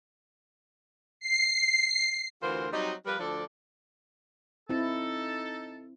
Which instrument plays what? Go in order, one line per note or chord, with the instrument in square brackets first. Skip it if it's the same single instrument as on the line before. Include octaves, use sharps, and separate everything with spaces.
[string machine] C7
[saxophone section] D2 E3 F4 F#4 A#4 C5
F#3 G3 C4 D#4
F3 G3 A#4 B4
D2 F3 D4 A4 D5
[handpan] C4 E4 [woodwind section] D#4 A4